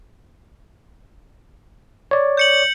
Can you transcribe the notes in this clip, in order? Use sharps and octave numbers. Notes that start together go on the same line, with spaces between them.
C#5 D5
G6 C#7 F#7